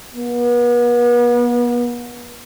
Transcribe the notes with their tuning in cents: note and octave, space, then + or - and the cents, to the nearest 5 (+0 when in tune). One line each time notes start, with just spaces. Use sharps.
B3 -40